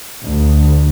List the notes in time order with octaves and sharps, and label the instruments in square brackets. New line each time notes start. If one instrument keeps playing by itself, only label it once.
[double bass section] D2